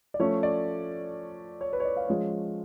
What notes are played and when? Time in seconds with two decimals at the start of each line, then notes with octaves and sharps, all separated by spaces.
0.14 D5
0.19 F3 A3 C#4 C#5
0.43 D5
1.61 C#5
1.73 B4
1.80 C#5
1.85 D5
1.97 F5
2.08 F3 G#3 C#4